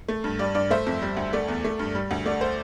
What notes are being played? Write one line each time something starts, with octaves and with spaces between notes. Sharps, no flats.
A3
G2
G3 D5
G2 D5
A3 C5 E5
F2
G3
D2
A3 D5
E2
A3
G2
G3
D2
A3 D5
C5